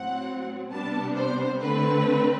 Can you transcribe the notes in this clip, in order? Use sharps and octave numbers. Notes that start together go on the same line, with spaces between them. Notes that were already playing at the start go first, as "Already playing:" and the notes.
Already playing: A2 F#3 C4 F#5
C3 G3 B3 D4 A5
C5
D3 A3 C4 B4